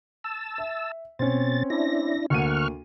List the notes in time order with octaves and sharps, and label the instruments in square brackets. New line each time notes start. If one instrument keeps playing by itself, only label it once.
[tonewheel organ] A5 E6
[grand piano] E5
[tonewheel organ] B2 A6 [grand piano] C4 C#4
[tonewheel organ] D4 E4 A#6
[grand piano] D2 A#3 D#7 [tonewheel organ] F#5 C#6 F6